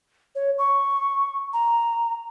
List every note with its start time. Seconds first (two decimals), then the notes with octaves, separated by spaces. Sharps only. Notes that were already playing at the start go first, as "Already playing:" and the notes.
0.35 C#5
0.58 C#6
1.53 A#5